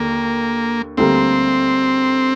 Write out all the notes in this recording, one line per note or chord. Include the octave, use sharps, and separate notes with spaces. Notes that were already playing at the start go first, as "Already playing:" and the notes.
Already playing: D#2 D3 A#3
D2 D3 G3 A#3 C4